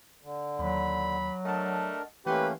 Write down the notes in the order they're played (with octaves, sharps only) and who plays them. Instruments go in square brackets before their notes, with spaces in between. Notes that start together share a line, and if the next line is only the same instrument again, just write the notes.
[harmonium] D3
[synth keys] D#2 [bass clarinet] F#3 [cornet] B5
[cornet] A3 [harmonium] D4 A#4 [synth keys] D#5 F#5 A5
[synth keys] E3 F#5 C6 [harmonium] A3 A#3 C#4 [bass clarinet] G4 [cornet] B4